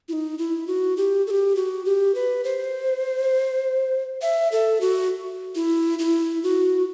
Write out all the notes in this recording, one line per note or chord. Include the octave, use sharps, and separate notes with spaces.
E4
D#4
E4
F#4
G4
A4
G4
F#4
G4
B4
C5
E5
A4
F#4
E4
E4
F#4